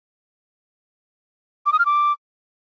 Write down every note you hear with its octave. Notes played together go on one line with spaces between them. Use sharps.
D6
D#6
F6
D6